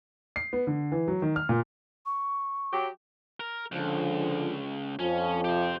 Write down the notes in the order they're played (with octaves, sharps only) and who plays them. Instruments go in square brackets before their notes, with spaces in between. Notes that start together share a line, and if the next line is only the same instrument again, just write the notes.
[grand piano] C7
B3
D3
E3
F#3
D#3
F6
A#2
[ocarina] C#6
[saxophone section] F#3 G4
[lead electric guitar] A#4
[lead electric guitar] C#2 [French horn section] D3 F3
[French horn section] F2 F3 [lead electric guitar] C#4
[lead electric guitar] G4 C5